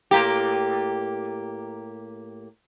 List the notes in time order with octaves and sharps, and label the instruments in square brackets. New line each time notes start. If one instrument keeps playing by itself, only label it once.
[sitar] A2 A#3 G4